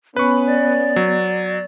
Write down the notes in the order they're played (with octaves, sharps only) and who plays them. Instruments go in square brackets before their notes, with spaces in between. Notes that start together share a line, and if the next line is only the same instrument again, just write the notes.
[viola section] B3 [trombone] C#4 [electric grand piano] B4 C#6 [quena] B5
[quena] D5
[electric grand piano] F#3